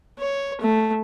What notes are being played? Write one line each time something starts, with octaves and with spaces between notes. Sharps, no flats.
C#5
A3